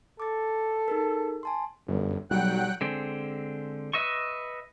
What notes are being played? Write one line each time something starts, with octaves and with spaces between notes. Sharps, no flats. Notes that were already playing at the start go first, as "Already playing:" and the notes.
A4 D6 A6
D#4 G#4 A#4
G#5 A5 C6
G1 F#2
B1 F#3 G3 F#5 G5 F#6
D3 G#3 C4
B4 D#5 E5 C#6